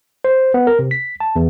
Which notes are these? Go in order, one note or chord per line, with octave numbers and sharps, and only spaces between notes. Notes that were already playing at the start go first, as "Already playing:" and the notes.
C5
B3
A#4
C3
B6
A5
E2